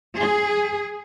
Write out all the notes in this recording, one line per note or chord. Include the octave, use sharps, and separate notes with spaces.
G#4